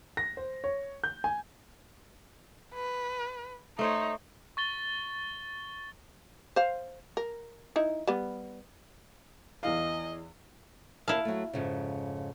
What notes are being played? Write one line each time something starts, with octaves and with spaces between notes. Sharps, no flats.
A#6
C5
C#5
G6
G#5
B4
A3 D#4 C5 C#5
C#6 A6 G7
C5 F5
A#4
D#4 E4
G3 B3
E2 E3 D#5 F5
D#2 E4 A#4 F5 A5
F#3 A3
F2 G#2 C#3